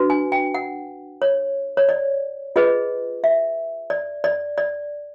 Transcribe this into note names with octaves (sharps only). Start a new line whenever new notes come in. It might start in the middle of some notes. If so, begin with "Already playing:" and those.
Already playing: D4 F#4 B4
G#5
G5
F#5
C#5
C#5
D5
F4 G#4 B4 D#5
E5
D5
D5
D5